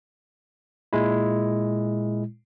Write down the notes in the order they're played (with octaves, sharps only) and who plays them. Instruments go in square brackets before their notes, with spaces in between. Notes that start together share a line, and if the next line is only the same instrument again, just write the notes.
[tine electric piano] A#2 G#3 E4